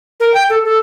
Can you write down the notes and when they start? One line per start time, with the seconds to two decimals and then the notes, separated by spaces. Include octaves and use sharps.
0.20 A#4
0.34 G5
0.50 A4
0.65 A4